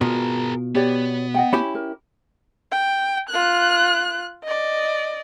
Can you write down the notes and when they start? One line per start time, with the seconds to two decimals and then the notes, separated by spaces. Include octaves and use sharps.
0.01 B2 F4 G#4 A#4
0.75 B3 G4 C#5 D5
1.34 D#5 F#5 G5
1.53 C#4 E4 G4 B5
1.75 A#4
2.72 G5
3.30 F4 F#6
4.44 D5 D#5